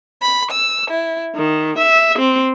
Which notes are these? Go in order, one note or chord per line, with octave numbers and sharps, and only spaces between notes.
B5
E6
E4
D#3
E5
C4